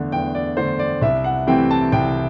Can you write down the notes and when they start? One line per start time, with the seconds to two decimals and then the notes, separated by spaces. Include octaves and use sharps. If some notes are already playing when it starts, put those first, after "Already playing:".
Already playing: E2 D3 A3
0.12 E2 G5
0.35 D5
0.57 D3 A3 C5
0.79 D5
1.02 C2 E5
1.24 F#5
1.47 C3 E3 A3 C4 G5
1.71 A5
1.92 C2 G5